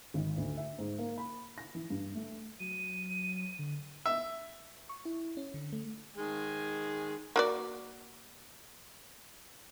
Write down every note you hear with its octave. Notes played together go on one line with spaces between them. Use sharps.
G#1
D2
E5
G#2
A#3
B5
A#6
E3
G2
A3
F#3 D#7
D3
E5
C#6
E4
C#4
D3
A3
D#3 G#3 G#5
A#3 F#4 D5